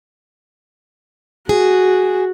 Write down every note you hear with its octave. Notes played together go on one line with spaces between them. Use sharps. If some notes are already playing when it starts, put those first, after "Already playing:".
F#4 G#4